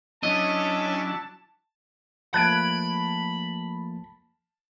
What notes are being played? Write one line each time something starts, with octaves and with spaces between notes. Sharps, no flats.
F#3 C#4 D4 E4 D#5 A5
F3 A3 A#3 A5 B5 F#6 G#6 D7